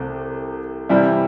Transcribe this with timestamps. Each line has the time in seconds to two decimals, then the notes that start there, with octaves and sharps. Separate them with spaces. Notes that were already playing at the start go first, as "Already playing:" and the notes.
Already playing: C2 C3 A3
0.89 C3 E3 G3 E4